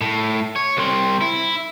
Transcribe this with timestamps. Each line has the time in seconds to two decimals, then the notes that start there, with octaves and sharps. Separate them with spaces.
0.01 A2
0.56 C#5
0.77 C2 C4
1.21 E4